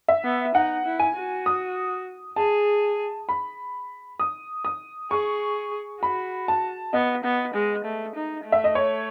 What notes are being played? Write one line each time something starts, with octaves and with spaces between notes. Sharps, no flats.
E5
B3
D#4 F#5
E4
G#5
F#4
D#6
G#4 A5
B5
D#6
D#6
G#4 C#6
F#4 B5
A5
B3 D#5
B3
G#3
A3
D#4
A3
E5
D#5
C#5